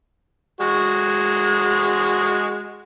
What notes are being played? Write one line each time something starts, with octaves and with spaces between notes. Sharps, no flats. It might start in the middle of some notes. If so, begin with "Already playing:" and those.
G#3 F#4